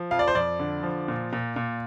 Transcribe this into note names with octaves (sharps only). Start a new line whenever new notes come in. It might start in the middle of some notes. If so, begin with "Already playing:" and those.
Already playing: F3
F2 F5
D5
C5
F2 D5
D3
F3
A#2
A#2
A#2